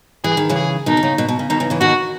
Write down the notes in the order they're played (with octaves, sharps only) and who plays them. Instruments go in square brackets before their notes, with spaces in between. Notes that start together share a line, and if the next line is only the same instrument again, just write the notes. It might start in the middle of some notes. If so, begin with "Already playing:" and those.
[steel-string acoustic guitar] E3 [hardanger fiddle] G#4
[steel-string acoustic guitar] D#3
C#3 E3
[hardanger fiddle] G#4
[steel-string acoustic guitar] B2 D#3 [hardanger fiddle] D#4
[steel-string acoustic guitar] D#3
C#3
B2
B2
C#3
[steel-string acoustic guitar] B2 D#3 [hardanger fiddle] D#4
[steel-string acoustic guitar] C#3 E3
C#3 E3
[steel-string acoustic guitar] B2 D#3 [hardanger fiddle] F#4